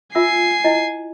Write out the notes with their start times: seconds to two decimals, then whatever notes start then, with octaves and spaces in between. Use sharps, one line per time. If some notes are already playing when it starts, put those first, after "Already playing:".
0.15 F4 E5 G#5 E6 C7
0.64 E4 D#5